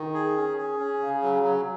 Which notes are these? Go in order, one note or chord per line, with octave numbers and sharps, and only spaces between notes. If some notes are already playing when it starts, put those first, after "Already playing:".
Already playing: D#3
G#4
C#4
G#4
C#4
C#3
F#3
F#3